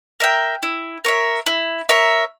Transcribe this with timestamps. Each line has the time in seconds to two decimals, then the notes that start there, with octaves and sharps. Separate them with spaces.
0.20 A#4 E5 G5
0.63 E4
1.05 A#4 C#5 E5
1.46 E4
1.89 A#4 C#5 E5